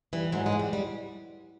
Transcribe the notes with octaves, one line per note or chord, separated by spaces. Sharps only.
E3 G3
G#2 F#3
G#3
E3
G3
G3